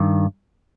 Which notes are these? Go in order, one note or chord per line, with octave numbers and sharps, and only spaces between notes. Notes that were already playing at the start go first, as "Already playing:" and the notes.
Already playing: G2 D#3